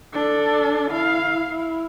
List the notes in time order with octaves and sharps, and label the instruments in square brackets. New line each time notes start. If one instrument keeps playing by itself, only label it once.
[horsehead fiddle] D4 A4
E4 F5
E4